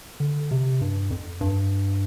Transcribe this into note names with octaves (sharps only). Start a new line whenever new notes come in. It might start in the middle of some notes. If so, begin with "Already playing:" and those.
D3
C3
G2
F2
G2